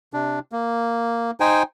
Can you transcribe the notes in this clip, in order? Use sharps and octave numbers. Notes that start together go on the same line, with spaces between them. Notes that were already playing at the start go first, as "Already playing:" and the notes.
C3 D4
A#3
D#4 C5 G5 G#5